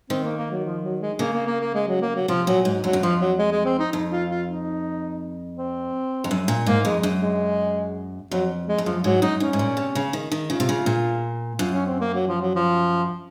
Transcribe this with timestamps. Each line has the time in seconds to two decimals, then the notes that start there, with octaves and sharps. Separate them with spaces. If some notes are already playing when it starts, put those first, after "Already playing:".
0.10 D#3 C4
0.24 A#3
0.37 A#3
0.51 F#3
0.65 F3
0.83 F#3
1.01 G#3
1.19 C#3 A#3
1.33 A#3
1.47 A#3
1.60 A#3
1.74 G#3
1.88 F#3
2.02 A#3
2.15 F#3
2.28 C3 F3
2.47 A#2 F#3
2.65 G#2 F#3
2.83 F2 F#3
2.93 F#2
3.02 F2 F3
3.20 F#3
3.38 G#3
3.52 G#3
3.65 C4
3.79 D#4
3.93 F2 D#4
4.11 F4
4.30 F4
4.48 D#4
5.57 C4
6.24 F2
6.31 F#2
6.48 A#2
6.66 G#2 A#3
6.85 F2 G#3
7.03 F#2
7.21 G#3
8.31 F2 F#3
8.67 G#3
8.78 F2
8.86 F#2 F3
9.04 G#2 F#3
9.22 F#2 D#4
9.40 G#2 C#4
9.53 G#2
9.59 A#2
9.77 C3
9.95 C#3
10.13 D#3
10.32 D#3
10.50 C#3 F4
10.60 C3
10.69 C#3
10.86 A#2
11.59 F#2 F4
11.73 C#4
11.86 C4
12.01 A#3
12.14 F#3
12.28 F3
12.42 F#3
12.55 F3